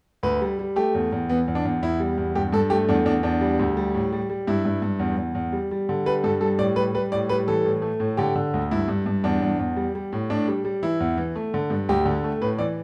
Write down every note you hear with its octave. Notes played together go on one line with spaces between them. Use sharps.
D2 B4
G3
G3
A3 G4
E2
E2
E3 B3
E2
D4
E2
E2 E4
G3
E2
G2 G4
G2 A4
A3 G4
E2 D4
E2 D4
E2 D4
G3
D2
G3
A2
G3
G3
G2 E4
G2
G2
E2
E2
E2
G3
G3
D3
G3 B4
G2 A4
G3 A4
A2 D5
G3 B4
G3 B4
A2 D5
G3 B4
E3 A4
A2
A3
A2
D3 G4
D3
D2
G2 E4
G2
G2
E2 D4
E2
E2
G3
G3
A2
A2 D4
G3
G3
E3 E4
E2
E3
A3
D3
G2
D2 G4
D3
A3
A2 B4
E3 D5